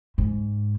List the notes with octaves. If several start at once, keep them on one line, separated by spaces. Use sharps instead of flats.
G#2